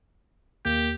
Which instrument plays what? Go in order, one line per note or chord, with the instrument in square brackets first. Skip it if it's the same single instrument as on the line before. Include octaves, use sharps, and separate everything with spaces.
[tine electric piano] D#2 A#3 G6 [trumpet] G4